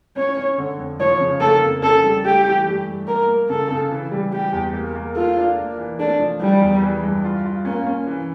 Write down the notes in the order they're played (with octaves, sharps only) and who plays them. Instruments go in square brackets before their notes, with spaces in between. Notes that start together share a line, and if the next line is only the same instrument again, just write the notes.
[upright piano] C#4 [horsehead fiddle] C#5
[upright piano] C#4
D3
F2
[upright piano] F3 [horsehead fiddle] C#5
[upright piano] C#3
[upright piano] A#3 [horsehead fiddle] A4
[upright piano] F2
[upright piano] C#4 [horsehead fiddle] A4
[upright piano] G3
[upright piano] A3 [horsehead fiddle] G4
[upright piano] E3
G2
G2
[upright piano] A#3 [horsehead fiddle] A#4
[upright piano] A#3
[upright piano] C#3 [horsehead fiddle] A4
[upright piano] C#3
E3
G3
[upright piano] G3 [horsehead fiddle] G4
[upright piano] E2
A#3
A#3
[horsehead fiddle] F4 [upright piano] A4
[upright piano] D4
A#3
E3
[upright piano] A3 [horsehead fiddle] D4
[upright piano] F3
[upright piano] E3 [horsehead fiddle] G3
[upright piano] E2
E3
G2
F4
F4
[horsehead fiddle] A#3 [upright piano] C#4
[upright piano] C#4
E3